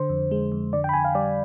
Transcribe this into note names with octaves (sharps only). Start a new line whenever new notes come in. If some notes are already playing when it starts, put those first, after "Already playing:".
Already playing: D3 C5
F2
G#3
F2
D3 D5
G5
B5
F2 G#5
F5
G3 D5